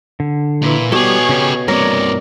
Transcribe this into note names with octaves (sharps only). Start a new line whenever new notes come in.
D3
A#2 E3
B2 G3 G4 A4 C#5 G#5 D6
C#3 C#4 G4
G2 C3 A#4 C#5 D5 A#5